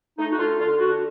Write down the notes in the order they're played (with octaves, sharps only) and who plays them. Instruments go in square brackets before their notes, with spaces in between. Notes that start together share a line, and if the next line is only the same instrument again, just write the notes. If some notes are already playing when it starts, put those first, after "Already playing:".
[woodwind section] A3 D#4
F#4
D3 F4
D3 F4
D3 F#4